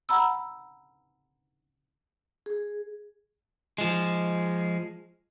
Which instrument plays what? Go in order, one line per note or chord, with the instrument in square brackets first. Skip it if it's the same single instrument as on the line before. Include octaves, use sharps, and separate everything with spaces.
[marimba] F#5 A#5 B5 E6
[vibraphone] G#4
[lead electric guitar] F3 G#3